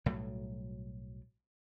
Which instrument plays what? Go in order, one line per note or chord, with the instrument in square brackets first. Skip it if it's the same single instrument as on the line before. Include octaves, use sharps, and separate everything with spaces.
[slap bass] B1 A2 F#3 G3